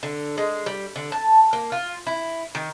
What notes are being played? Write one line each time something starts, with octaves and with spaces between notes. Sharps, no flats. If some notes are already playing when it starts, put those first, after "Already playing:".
D3
G#3
G3
D3
A5
A#3
F4
E4
D#3